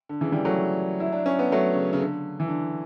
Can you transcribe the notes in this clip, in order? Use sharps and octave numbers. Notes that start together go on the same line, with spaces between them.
D3
C#3 E3
E3 G3
F#3 A3
E4
D4
C#4
B3
F#3 A3
C#3
C#3
D3
E3
D3